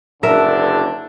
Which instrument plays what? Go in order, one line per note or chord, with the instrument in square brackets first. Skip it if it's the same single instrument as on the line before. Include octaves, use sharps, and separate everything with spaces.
[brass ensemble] F#1 D3 D4 [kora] A#4 E5